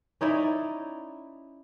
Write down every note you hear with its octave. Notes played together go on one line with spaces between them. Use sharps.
C#4 D#4 E4 D5